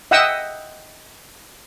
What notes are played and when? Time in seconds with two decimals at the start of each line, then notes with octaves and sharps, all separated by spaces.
0.11 D#5 E5 F#5 G5 D#6 E6